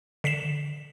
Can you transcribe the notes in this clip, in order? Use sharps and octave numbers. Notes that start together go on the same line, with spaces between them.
D3 B6 C7 E7